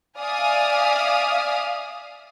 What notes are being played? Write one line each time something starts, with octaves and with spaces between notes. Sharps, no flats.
D5 E5 F5 G#5 D#6 F6